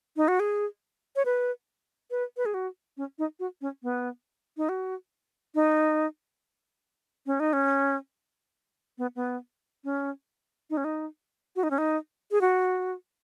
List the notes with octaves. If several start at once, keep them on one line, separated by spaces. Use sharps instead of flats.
D#4
F#4
G#4
C#5
B4
B4
B4
G#4
F#4
C#4
D#4
F#4
C#4
B3
D#4
F#4
D#4
C#4
D#4
C#4
B3
B3
C#4
D#4
C#4
D#4
F#4
D#4
C#4
D#4
G#4
F#4